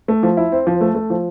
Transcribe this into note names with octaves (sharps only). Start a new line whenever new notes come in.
A3
F3
E4
C4
F3
A3
A3
F3